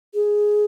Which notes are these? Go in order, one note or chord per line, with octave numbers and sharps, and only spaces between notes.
G#4